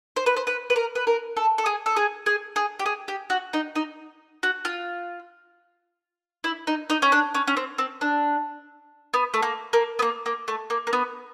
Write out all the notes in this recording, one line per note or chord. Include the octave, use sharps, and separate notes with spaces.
C5
B4
C5
B4
B4
A#4
B4
A#4
A4
A4
G#4
A4
G#4
G#4
G#4
G4
G#4
G4
F#4
D#4
D#4
F#4
F4
E4
D#4
D#4
C#4
D4
C#4
C#4
C4
C4
D4
B3
A3
A#3
A#3
B3
A#3
A#3
A3
A#3
A#3
B3